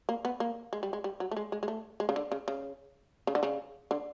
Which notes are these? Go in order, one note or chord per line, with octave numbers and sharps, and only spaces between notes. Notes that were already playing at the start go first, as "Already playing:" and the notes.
A#3
B3
A#3
G#3
G3
G#3
G3
F#3
A3
G#3
G#3
G#3
A3
G#3
C#3
D3
C#3
C#3
C#3
D3
C#3
D3